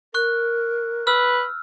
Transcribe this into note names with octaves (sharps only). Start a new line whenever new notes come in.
A#4 C#6 F#6
B4 E6 F6